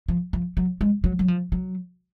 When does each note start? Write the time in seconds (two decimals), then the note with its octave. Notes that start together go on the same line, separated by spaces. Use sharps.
0.08 F3
0.33 F3
0.57 F#3
0.81 G#3
1.04 F#3
1.19 F#3
1.28 F3
1.52 F#3